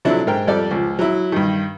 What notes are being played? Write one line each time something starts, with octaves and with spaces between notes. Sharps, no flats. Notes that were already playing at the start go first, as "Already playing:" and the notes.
C3 F3 F#3 D4 E4 A4
G#2 A#4 G5
F2 G3 A4 D5
C#2 F3
F#3 E4
G2 D#3